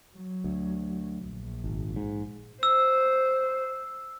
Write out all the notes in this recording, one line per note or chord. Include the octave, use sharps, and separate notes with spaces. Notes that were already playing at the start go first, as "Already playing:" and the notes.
F#3
D2
A#1
G#1
G#2
C5 E6